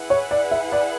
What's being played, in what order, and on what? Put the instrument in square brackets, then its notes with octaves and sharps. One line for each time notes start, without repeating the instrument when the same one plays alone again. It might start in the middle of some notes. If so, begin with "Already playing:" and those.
Already playing: [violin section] E4 G#4 B4 F#5
[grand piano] C#5
D5
E5
D5